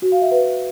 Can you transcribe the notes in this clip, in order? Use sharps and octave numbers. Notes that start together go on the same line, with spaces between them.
F#4
F5
E5
B4